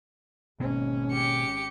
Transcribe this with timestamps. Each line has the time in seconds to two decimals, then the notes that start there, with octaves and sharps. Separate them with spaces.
0.60 G#1 B2 A#3 C#4
1.12 G4 C#7